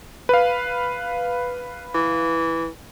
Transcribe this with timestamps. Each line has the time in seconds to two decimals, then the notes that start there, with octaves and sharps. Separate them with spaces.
0.29 B4 F5
1.95 E3